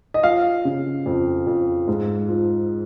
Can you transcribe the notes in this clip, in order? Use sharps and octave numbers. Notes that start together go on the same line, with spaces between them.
D#5
F3 F5
C#3
F2
F2
G#2
F3